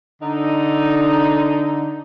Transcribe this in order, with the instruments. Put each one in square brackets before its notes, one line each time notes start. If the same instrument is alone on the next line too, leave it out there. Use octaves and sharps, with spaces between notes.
[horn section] D3 D#4